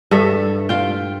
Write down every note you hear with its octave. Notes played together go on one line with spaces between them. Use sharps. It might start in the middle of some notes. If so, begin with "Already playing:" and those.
G2 A4 E5
F4 G5